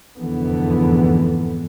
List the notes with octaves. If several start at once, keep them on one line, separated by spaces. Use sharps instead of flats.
F1 E2 G#2 D3 E3 B3